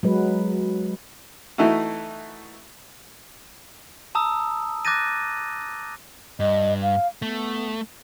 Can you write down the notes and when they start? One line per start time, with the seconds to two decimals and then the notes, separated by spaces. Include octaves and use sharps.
0.03 F#3 G#3 B4
1.58 E3 A3 D#4 E4 F#4
4.15 A5 A#5 D#6 E6
4.85 D6 F#6 G6 A6 A#6 D#7
6.40 G2 D#5
6.82 F5
7.22 A3 B3